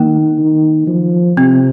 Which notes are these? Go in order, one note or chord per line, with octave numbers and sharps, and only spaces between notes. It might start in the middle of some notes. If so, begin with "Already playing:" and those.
Already playing: D#3 A#3
D#3
F3
C3 C4